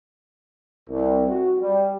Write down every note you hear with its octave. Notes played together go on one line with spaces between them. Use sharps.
C2
F#4
G3